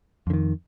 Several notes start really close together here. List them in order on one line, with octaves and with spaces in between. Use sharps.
F2 D3 D#3